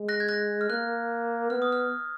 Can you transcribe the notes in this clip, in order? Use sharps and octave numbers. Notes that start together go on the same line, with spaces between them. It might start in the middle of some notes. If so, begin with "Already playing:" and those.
Already playing: G#3
F#6 A#6
G#6
F#6 A#6
F6
A#3 F#6
B3 F6
D#6
F6